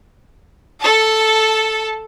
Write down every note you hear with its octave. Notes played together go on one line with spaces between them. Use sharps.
A4 A5